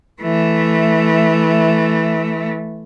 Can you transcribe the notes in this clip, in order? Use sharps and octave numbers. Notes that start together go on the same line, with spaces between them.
E3 A3